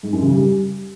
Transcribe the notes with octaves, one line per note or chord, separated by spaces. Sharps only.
G#2
F#2
C#3
G3